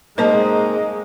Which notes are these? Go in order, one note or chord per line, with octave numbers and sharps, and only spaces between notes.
G#3 A#3 C4 D#4 C5 D#5 A5